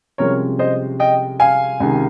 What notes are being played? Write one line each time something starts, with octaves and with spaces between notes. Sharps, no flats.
C2 C3 F3 G#3 C#4 A#4 C#5
C5 D#5
D#5 G5
F5 G#5
C#2 C3 D#3